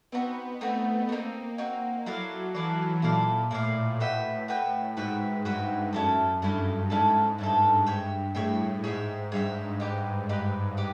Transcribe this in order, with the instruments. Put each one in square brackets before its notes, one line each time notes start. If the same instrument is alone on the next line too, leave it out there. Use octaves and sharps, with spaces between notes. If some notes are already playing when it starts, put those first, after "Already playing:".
[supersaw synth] B3 [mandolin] C4 D#4 F#4
[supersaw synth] A3 [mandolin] C4 D#4 F#4
[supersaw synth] A#3 [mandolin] C4 D#4 F#4
[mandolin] C4 D#4 F#4
[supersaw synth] F#3 [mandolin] E4 A4 D5 F5
[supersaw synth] E3 [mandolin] E4 A4 D5 F5
[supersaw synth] A#2 [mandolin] E4 A4 D5 F5
[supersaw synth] A2 [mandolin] E4 A4 D5 F5
[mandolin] F#4 B4 E5 G5
F#4 B4 E5 G5
[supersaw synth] G#2 [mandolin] F#4 B4 E5 G5
[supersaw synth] G2 [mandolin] F#4 B4 E5 G5
[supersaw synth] F#2 [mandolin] A3 C#4 E4 A4
[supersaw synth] G2 [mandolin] A3 C#4 E4 A4
[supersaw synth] G#2 [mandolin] A3 C#4 E4 A4
[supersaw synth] G2 [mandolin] A3 C#4 E4 A4
[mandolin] G#4 C#5 E5 G5
[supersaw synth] A2 [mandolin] G#4 C#5 E5 G5
[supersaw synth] G#2 [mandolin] G#4 C#5 E5 G5
[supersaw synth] G2 [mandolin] G#4 C#5 E5 G5
[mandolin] D#4 G4 B4
D#4 G4 B4
G4 B4